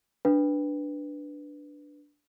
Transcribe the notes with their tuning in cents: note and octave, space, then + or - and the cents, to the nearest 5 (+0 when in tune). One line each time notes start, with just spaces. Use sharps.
D4 +0 B4 +0